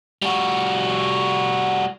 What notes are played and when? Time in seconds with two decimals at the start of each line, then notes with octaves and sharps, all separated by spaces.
0.22 G3 F#4